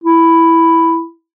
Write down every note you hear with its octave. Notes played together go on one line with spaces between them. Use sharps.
E4